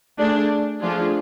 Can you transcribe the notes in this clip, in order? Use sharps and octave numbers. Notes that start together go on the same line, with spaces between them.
A3 D4 G#4
F3 A3 D4 F4 G#4